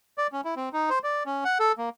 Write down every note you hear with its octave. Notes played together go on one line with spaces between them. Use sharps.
D5
C#4
E4
C4
D#4
C5
D5
C#4
F#5
A4
A#3